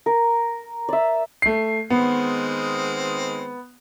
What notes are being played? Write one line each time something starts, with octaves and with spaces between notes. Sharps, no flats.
A#4
D5 E5
A3 C7
D#3 G#3 B3 C4